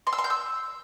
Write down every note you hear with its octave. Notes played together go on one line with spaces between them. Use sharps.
C6
E6
C6
G6
E6